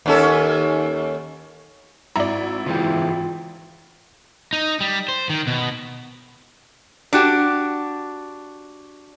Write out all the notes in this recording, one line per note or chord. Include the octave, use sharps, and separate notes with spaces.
D#2 C#4 A4
G#1 E4 D5 A#5
C#3 E3 G#3 F4 G5
D#4
G3
C5
D#3
B2
D4 F#4 G4